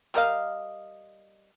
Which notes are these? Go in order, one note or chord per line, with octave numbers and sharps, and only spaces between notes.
G3 A#4 D#5 F5